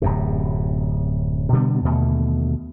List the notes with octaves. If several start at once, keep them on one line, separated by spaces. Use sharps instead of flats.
D1 F#2 C3
B2 D3 G3 B3
D#2 B2 D3 A3